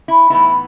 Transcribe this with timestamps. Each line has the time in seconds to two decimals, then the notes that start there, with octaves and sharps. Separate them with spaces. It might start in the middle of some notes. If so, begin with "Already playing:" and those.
0.08 E4
0.30 A2 E3 B3 D#4 E4